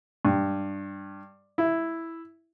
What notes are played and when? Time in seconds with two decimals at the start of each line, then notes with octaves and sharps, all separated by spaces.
0.25 G2
1.58 E4